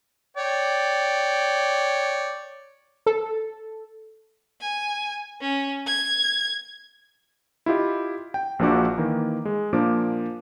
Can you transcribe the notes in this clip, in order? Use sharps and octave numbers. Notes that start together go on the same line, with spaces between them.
C#5 D5 G5
A4
G#5
C#4
G#6
E4 F4 G4 D#5
G5
A#1 A#2 F3 D4 F#4 D6
D#3 E3 A#3
G#3
A#2 F3 A#3 D4 D6